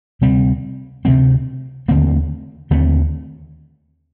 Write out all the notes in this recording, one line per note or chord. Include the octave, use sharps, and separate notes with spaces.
D2 C3 G3 C4
D2 C3 G3 C4
D#2 D3 A3 C4
D#2 D3 A3 C4